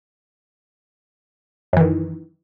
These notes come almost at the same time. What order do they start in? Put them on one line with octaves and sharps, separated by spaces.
F#2 E3 D#3